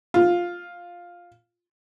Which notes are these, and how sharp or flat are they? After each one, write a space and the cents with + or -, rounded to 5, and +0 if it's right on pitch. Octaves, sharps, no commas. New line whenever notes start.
F4 +5